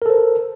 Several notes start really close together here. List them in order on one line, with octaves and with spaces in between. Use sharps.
A#4 A4 C5